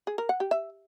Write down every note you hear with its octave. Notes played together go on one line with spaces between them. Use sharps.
G#4
A#4
F#5
G4
E5